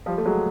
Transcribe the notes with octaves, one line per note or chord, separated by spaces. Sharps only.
F3 G3
A3
F#3 G#3